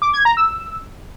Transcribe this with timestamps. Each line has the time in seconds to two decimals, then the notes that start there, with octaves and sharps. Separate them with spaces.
0.02 D6
0.13 G#6
0.25 A#5
0.37 E6